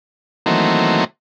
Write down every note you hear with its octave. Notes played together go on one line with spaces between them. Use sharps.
D#3 E3 F#3 A3 A#3 C4